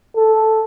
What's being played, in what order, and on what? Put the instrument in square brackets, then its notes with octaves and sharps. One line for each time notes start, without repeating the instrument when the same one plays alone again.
[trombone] A4